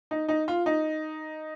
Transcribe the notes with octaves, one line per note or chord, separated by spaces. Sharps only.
D#4
D#4
F4
D#4